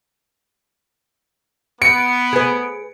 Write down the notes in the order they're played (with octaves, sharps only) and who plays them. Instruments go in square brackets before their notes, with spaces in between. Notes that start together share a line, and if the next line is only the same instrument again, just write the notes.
[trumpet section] B3 [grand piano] C#7 [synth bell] D7
[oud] G#4 B4